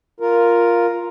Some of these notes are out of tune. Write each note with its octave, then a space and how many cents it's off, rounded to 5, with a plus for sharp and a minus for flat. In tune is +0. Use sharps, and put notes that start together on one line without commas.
F4 +0 A#4 +0